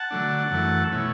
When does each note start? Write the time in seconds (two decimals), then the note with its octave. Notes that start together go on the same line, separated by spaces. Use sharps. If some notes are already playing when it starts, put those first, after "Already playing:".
Already playing: F#5 A5
0.11 D3 F#3 A3 D4
0.52 F#2 E3 A3
0.92 B2 A3 C#4 E4